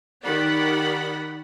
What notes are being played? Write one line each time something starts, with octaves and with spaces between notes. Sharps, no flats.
D#3 G4 D5 F#5 B5